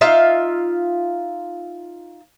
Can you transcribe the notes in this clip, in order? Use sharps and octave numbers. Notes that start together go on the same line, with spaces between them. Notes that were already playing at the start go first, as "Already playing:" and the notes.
D#4 F4 E5 F5